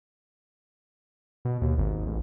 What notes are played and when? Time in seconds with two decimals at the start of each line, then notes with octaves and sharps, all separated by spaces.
1.45 B2
1.62 D#2
1.78 G#1
2.07 A1